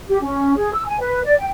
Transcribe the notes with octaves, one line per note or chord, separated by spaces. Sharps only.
G4
C#4
G#4
E6
G#5
B4
D5
G5